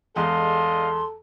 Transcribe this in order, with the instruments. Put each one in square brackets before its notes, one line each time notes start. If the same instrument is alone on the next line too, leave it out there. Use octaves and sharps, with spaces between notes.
[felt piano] E2 G#3 [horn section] D4 D#5 F5 [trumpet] A4 [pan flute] C6